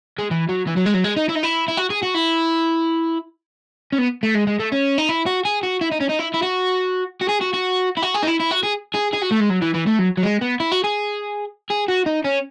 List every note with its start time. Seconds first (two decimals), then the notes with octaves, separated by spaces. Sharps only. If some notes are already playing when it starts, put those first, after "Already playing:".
0.19 G#3
0.31 E3
0.49 F#3
0.67 E3
0.77 F#3
0.86 G#3
0.94 F#3
1.04 G#3
1.16 D#4
1.29 E4
1.35 D#4
1.43 E4
1.68 E4
1.77 F#4
1.90 G#4
2.03 F#4
2.14 E4
3.92 C#4
3.98 B3
4.23 A3
4.35 G#3
4.47 G#3
4.59 A3
4.72 C#4
4.98 D#4
5.09 E4
5.26 F#4
5.45 G#4
5.63 F#4
5.81 E4
5.91 D#4
6.00 C#4
6.09 D#4
6.19 E4
6.34 E4
6.42 F#4
7.21 F#4
7.28 G#4
7.41 F#4
7.53 F#4
7.97 E4
8.02 F#4
8.14 G#4
8.23 D#4
8.27 E4
8.40 E4
8.51 F#4
8.63 G#4
8.94 G#4
9.13 G#4
9.22 F#4
9.31 A3
9.40 G#3
9.49 F#3
9.62 E3
9.74 E3
9.87 A3
9.99 F#3
10.17 F#3
10.23 G#3
10.41 B3
10.60 E4
10.72 F#4
10.84 G#4
11.70 G#4
11.88 F#4
12.06 D#4
12.25 C#4